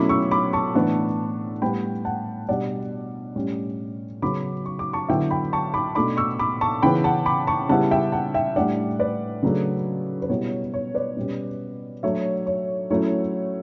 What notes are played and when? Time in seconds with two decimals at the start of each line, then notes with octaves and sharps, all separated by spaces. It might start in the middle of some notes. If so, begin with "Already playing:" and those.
Already playing: B2 F#3 A3 C#4 E4 B5 D6
0.09 C#6 E6
0.31 B5 D6
0.53 A5 C#6
0.75 A2 E3 B3 D4
1.62 A2 G3 B3 G5 B5
2.05 F#5 A5
2.49 B2 G3 D4 D5 F#5
3.36 A2 G3 C#4
4.22 C#3 F#3 B3 B5 D6
4.66 C#6
4.79 D6
4.93 A5 C#6
5.08 D3 F#3 B3 E4 E5 G5
5.31 G5 B5
5.53 A5 C#6
5.74 B5 D6
5.95 B2 A3 D4 B5 D6
6.17 C#6 E6
6.39 B5 D6
6.61 A5 C#6
6.82 C#3 E3 B3 G5 B5
7.04 F#5 A5
7.26 B5 D6
7.47 A5 C#6
7.69 C#3 G3 B3 E4 F#5 A5
7.91 E5 G5
8.12 F#5 A5
8.34 E5 G5
8.56 A2 G3 D4 D5 F#5
8.99 B4 D5
9.43 C#3 F#3 A3 D4
10.22 B4
10.29 B2 G3 B3 E4 C#5
10.74 C#5
10.95 B4 D5
11.17 B2 G3 C#4
12.03 F#3 A3 D4 C#5 E5
12.46 C#5
12.90 F#3 A3 C#4 E4 C#5